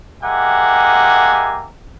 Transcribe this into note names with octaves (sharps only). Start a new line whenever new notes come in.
G#3 A#3 G4 E5 F#5 G#5